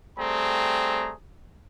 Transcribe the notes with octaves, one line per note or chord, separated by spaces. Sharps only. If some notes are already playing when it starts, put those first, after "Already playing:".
G3 A3 C4 G#4 A#5